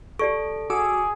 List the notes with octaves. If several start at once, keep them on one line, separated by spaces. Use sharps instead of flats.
G4 A4 D5 C#6
F#4 G#4 D6 E6